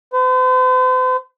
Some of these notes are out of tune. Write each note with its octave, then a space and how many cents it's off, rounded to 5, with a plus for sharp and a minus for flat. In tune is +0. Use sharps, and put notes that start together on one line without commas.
C5 -45